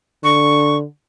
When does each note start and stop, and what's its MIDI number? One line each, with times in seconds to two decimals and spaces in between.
0.24 0.84 50
0.24 0.77 85